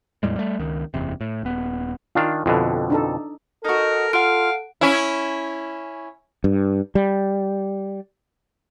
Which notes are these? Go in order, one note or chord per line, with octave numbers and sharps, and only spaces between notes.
E2 A2 G3 G#3
G3 A3
C#2 D#3
F#1 E2 C3
A2
D#1 B3
D#3 D4 F4 F5
F2 B2 D3 E4
D4 D#4 A4
D#4 F#4 A4 A#4
F4 F5 F#5 F6 D7
C#4 E4
G2
G3